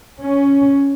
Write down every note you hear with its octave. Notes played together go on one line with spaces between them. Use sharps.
C#4